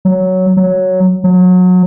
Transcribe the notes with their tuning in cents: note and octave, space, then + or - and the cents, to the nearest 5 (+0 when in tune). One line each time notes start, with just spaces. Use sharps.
F#3 +5
F#3 +0
F#3 -25